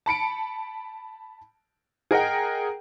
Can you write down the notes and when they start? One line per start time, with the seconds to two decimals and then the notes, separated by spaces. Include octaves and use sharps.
0.06 A5 B5 C#7 D7
2.11 G#4 A#4 D#5 F#5 G5